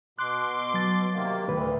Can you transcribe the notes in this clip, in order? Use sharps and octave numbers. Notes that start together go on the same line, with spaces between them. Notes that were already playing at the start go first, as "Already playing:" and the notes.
B2 C6 D6 F#6
F#3 A6
C3 D#3 A#3
D2 A2 D#3 B4